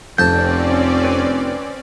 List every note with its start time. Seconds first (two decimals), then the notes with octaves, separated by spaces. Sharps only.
0.18 F1 F2 C4 C#4 D5 A5 G6
1.05 B4